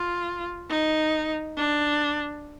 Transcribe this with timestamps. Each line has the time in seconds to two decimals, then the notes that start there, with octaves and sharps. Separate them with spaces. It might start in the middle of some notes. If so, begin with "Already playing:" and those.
Already playing: F4
0.69 D#4
1.57 D4